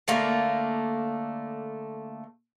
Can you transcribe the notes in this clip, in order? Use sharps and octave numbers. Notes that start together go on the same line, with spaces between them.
D3 A3 A#3 A4